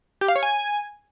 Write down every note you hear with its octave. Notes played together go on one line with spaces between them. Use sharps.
G4
F5
C#5
G#5